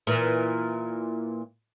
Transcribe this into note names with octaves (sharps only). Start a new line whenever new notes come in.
A#2 E3